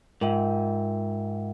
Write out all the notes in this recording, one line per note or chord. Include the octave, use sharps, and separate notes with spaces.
G#2 F4 A#4 E5 G5